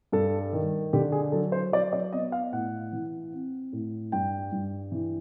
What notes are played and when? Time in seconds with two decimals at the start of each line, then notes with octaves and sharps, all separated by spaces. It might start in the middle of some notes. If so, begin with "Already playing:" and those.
0.12 G2 A4
0.53 D#3
0.93 D3 G4
1.12 G#4
1.32 F#3 A4
1.52 C5
1.72 F#3 D5
1.93 D5
2.13 B3 D#5
2.32 F5
2.52 A2 F#5
2.92 E3
3.33 C4
3.73 A2
4.12 G2 G5
4.52 G2
4.92 E3